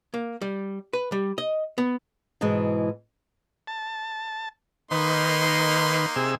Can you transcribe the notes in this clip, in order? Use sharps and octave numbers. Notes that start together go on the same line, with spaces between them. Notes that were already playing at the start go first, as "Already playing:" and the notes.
A#3
G3
B4
G3
D#5
B3
G#2 B2 E3 G#3
A5
D#3 A#3 D#4 B4 C6
C3 G#4 E6